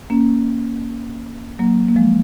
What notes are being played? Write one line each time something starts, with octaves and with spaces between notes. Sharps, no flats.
A#3 C#4
F#3 A#3
A#3
F3 G#3